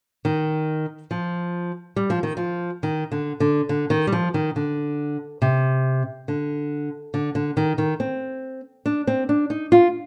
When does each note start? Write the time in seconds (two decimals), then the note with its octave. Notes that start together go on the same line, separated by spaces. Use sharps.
0.25 D#3
1.11 F3
1.96 G3
2.10 F3
2.23 D#3
2.37 F3
2.83 D#3
3.12 D3
3.40 D3
3.69 D3
3.90 D#3
4.07 G3
4.12 F3
4.34 D#3
4.56 D3
5.42 C3
6.28 D3
7.14 D3
7.35 D3
7.57 D#3
7.78 D#3
8.00 C4
8.86 D4
9.07 C4
9.29 D4
9.50 D#4
9.72 F4